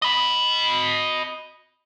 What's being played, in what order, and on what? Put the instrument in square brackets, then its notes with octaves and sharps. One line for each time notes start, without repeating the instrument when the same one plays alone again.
[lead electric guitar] D#5 B5